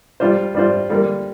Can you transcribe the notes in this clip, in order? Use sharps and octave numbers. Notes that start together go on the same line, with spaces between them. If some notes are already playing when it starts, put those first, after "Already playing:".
G3 D4 F4 C5
G3 D4 F4 C5
D3 G3 A#3 D4 A#4